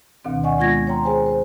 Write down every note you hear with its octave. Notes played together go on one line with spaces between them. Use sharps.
D2 B2 D#3 C4
D5 D#5 F#5 G#5 C#6
G#3 B3 F4 C#6 G#6 A#6
C#5 G5 A#5 C6
G#4 C5 G#5
C5